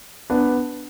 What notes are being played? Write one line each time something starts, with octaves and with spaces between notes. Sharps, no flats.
B3 D4